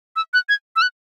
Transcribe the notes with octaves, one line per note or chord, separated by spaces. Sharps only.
E6
F#6
G#6
E6
F#6